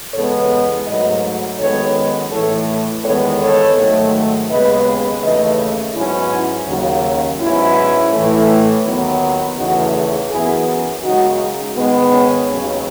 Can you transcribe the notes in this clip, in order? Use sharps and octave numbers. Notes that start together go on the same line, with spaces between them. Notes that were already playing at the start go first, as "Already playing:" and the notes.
E2 C#3 G#3 B3 A4 C#5
G#2 F#3 A3 B4 D#5
F#2 D#3 G#3 B3 A4 C#5
A2 E3 A3 A4 C#5
E2 D#3 G#3 B3 A4 C#5
A4 C#5
G#2 D#3 F#3 A3
D#2 C#3 G#3 B3 B4 D#5
D#2 C#3 E3 A3 B4 D#5
G#2 F#3 B3 C#4 E4
D#2 C#3 F#3
G#2 F#3 B3 C#4 E4
A2 E3 A3
D#2 D#3 F#3 B3
E2 C#3 E3 A3 D#4 F#4
F#2 E3 B3 E4 G#4
F#2 C#3 G#3 D#4 F#4
G#2 D#3 G#3 B3
C#4
D#2 C#3 F#3